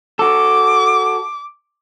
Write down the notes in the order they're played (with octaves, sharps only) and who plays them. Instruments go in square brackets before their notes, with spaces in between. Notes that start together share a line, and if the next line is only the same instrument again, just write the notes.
[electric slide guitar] F#4 A4 [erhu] D6